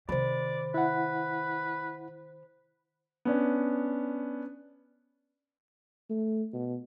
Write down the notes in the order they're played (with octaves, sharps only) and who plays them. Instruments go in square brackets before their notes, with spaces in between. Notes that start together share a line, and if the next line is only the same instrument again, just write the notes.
[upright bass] C3 D#3 [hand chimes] C5 B5 [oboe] D5
[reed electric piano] E4 F#5 [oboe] B4
[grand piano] B3 C#4 D4
[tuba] A3
B2